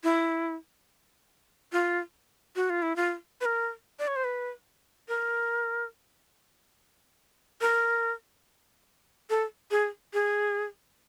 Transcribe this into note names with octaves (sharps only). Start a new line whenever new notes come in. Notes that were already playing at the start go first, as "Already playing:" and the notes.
E4
F4
F#4
F4
E4
F4
B4
A#4
D5
C#5
C5
B4
A#4
A#4
A4
G#4
G#4